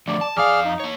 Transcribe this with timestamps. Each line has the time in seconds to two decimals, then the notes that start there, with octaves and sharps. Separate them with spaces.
0.08 D3 F3 A3 D5
0.21 A5
0.37 F2 G#4 D5 F5 F6
0.65 D#4
0.80 A#3 C#5